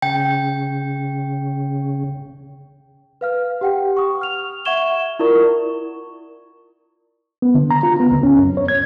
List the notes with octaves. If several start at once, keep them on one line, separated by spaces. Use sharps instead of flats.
C#3 G5
B4 F5 F6
G4 F#5 G5
C#6 D#6
F6 F7
E5 F#5 C#6 G#6 E7 G7
E4 F4 A#4 D5 C#6
B3
D3
A#5
F4
B3
C#2
C#4
F#2
C#5
G#6